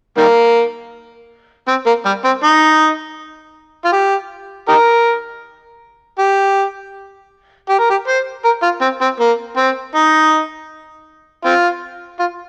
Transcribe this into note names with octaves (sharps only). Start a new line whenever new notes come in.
D#3 G3 A#3
C4
A#3
G3
C4
D#4
F4
G4
D#4 G4 A#4
G4
G4
A#4
G4
C5
A#4
F4
C4
C4
A#3
C4
D#4
C4 F4
F4